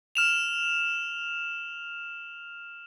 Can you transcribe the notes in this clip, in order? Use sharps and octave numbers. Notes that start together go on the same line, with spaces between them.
F6 E7 F7